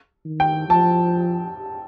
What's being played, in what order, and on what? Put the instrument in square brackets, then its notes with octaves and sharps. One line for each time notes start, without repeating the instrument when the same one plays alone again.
[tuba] D#3
[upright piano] G5
[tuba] F3 [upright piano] A5